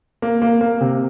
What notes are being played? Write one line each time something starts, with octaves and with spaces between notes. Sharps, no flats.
A#3
A#3
A#3
C3